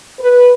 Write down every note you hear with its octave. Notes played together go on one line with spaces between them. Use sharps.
B4